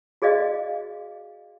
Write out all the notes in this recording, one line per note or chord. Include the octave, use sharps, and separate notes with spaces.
F#4 G#4 D5 D#5 F5